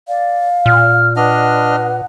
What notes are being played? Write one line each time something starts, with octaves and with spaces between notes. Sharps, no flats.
D5 F5
A#2 F6
D4 B4 D#5 F#5 F6